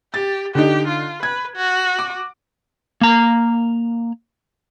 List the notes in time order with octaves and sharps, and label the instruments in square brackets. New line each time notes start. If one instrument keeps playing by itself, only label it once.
[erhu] G4 [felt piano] A6
[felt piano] D3 D#4 [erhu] G4
[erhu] F4
[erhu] B4 [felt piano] G#6
[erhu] F#4
[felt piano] D6
[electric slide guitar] A#3 A#5